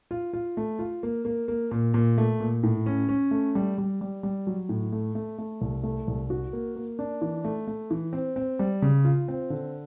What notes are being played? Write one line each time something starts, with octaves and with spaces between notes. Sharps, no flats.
F4
F4
A3
F4
A#3
A#3
A#3
A#2
A#2
A3
A#2
A2
C#4
C#4
A3
G3
G3
G3
G3
F#3
A2
A3
A3
A3
C2
A3
C2
F#4
A#3
A#3
D4
E3
A3
A3
E3
C4
C4
G3
C#3
F4
C4
D3